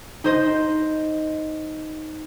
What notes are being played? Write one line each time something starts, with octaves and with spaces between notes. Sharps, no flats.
D#4 C5 D#5